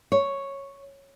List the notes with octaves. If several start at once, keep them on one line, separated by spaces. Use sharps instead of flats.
C#5